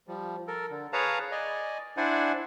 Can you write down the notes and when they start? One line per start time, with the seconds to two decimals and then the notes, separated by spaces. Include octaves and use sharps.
0.08 F3 G3
0.47 A4 A#4
0.71 D3
0.93 G#4 B4 C#5 F5 A5 A#5
1.32 D5 D#5 G#5
1.97 D4 E4 C5 D5 F#5 G#5